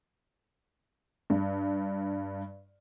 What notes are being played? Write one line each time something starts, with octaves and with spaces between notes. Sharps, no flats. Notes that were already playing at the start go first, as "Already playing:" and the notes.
G2